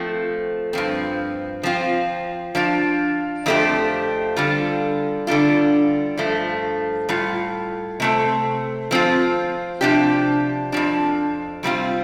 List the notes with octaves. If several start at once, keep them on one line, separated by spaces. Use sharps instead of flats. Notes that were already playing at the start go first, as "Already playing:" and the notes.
Already playing: F3 A3 C4
G2 F3 C4
F3 C4 F4
F3 D4 F4
F2 F3 A3 D4 G4
D3 G3 F4
D3 G3 D4 F4
G2 F3 A3
A2 G3 F4
C3 A3 C4
F3 C4 F4
C3 F3 D4 G4
F2 F3 D4
C3 G3 C4 F4